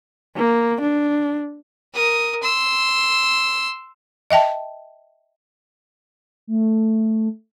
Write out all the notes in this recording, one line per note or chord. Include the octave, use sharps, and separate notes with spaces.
A#3
D4
A#4 D#6
C6 E6
D#5 E5 G5 A5
A3